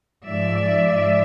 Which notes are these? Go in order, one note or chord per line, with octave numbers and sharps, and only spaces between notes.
G#2 F3 G#3 D5 E5
G#2 F3 G#3